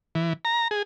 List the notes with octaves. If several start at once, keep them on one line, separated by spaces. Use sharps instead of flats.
E3
A#5
G#4